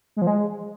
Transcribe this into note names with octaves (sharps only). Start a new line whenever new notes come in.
G#3
F3
G#3